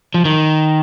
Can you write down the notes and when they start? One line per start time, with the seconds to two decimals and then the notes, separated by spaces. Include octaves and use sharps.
0.14 F3
0.25 D#3